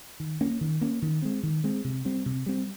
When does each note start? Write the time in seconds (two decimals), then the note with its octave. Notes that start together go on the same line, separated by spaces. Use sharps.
0.20 D#3
0.41 A#3 C#4
0.61 D#3
0.81 A#3 C#4
1.02 D#3
1.22 G#3 C4
1.43 D#3
1.64 G#3 C4
1.84 C3
2.05 G3 C4
2.26 C3
2.46 G3 C4